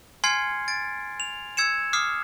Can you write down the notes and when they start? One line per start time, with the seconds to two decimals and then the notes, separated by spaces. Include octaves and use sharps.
0.24 G#5 C6 F6 G#6 C7 C#7
0.68 A6 D7
1.20 F7
1.57 E6 G#6 C#7 E7
1.93 D6 D#6 F6 C7